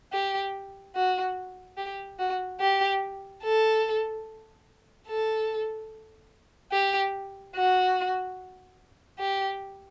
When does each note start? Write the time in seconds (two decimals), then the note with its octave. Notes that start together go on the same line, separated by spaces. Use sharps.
0.13 G4
0.95 F#4
1.78 G4
2.19 F#4
2.60 G4
3.43 A4
5.07 A4
6.72 G4
7.55 F#4
9.19 G4